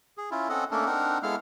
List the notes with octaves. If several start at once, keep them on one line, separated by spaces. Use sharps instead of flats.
G#4
C#4 E4 F4
C4 C#4 A4 D#5 F#5
A3 A#3 C#4 D4 A4 A#4
C4 D4 D#4 A#4 F#5
G#3 B3 E4 A4 F5 F6